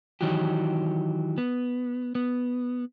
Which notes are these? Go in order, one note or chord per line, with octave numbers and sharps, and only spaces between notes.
D#3 E3 F#3 F#4 G4
B3
B3